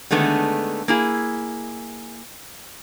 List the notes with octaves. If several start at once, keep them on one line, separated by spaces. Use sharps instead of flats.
D3 D#3 G#3 A3 B3
A#3 E4 G#4